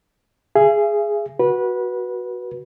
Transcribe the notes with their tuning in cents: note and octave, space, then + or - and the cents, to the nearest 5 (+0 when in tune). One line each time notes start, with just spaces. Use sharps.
G#4 +0 E5 +45
F#4 +0 B4 -20